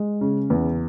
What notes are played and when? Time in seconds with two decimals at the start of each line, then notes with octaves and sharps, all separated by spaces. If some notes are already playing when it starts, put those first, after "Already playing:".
Already playing: G#3
0.21 C#3
0.50 E2